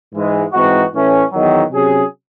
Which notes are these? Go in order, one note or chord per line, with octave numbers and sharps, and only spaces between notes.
G#2 E3 G#3
G#2 E3 C4 D#4 F#4
A2 E3 A3 C#4
E2 D#3 F#3
C3 F#3 C#4 G#4